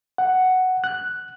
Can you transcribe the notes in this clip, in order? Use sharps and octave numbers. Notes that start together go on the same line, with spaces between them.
F#5
F#6